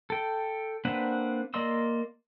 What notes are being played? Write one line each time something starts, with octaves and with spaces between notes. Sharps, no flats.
A4 G5
A#3 C4 D4 B4 F#5
A#3 D5 D#5 C6 E6